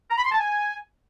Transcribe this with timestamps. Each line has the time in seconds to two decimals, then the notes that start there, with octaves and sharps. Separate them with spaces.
0.10 A#5
0.18 B5
0.25 C6
0.32 A5
0.39 G#5